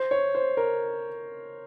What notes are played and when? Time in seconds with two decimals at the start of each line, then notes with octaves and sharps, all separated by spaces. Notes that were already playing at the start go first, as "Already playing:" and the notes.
Already playing: C5
0.11 C#5
0.35 C5
0.57 A#4